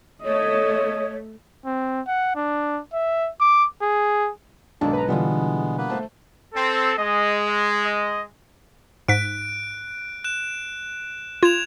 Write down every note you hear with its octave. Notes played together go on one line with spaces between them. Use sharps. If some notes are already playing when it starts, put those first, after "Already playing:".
A3 C#5 D#5
C4
F#5
D4
E5
D6
G#4
B1 G#2 D#3 G#3 A#3 D4 A5
B4 A#5
B2 D3 E3 G3 G#3 B3 D4 F4
A#3 B3 B4
A3 C5 A5
C4 A4
G#3 D#5
D#5
D#5
G#2 F#6 B6 D7
F#6
F#6 E7
F4 G#6 E7 F7